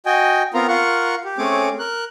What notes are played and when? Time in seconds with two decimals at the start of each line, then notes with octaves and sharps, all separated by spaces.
0.06 F#4 D#5 G5 G#5
0.54 B3 C4 F4 A#4 A#5
0.68 F4 A#4 F#5 C#6
1.25 G4
1.38 A3 C4 C#4 G#4 C#5 D6
1.79 A#4 F#6